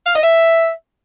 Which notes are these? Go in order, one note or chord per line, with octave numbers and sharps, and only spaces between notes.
F5
D#5
E5